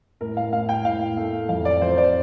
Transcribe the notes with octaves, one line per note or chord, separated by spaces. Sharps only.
A2 A#4
F5
A2 F5
G5
A2 F5
A3
F2 F5
D5
F2 C5
D5